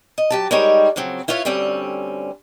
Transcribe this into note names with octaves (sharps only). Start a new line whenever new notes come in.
D#5
F#3 G4 A5
G3 G#3 D#4 A#4 C#5 G5
C#3 F3 F#3 C4
E4 F4 B4 C#5 D#5 F5
D2 D3 G3 C4 C#4